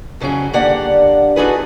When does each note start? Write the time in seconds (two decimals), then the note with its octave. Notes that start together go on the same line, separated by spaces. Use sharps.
0.20 F2 C#3 F#3 C#4 G#4
0.53 G2 D3 A#3 G4 D5 F#5
1.36 D4 D#4 F#4 G#4 A4 B4